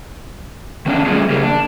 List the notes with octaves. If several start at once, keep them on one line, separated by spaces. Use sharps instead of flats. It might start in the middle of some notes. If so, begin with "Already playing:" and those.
D#3 B3 C#4 D4
G3 A3 C#4 F4 G#4
C#3 A#3 G4 G#4 A#4
D4